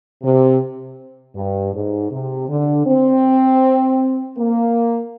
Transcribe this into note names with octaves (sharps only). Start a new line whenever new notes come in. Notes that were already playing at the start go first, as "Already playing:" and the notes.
C3
G2
G#2
C3
D3
C4
A#3